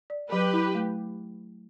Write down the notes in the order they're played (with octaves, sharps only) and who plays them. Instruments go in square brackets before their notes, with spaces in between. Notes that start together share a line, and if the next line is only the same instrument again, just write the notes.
[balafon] D5
[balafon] F#3 [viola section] G4 B4
[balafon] E4
A3